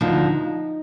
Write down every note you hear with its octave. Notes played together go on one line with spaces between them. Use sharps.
D2 D3 F3 D#4